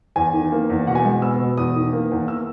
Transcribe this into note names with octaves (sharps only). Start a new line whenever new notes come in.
E2 G#5
D#3
A#3
E2
B2 F#5
G#5
G#3 F#5
B3 E6
B2
E2 D#6
D#3
A#3
E2
E6